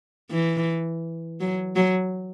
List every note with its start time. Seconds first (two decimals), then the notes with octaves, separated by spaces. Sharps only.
0.31 E3
1.40 F#3
1.76 F#3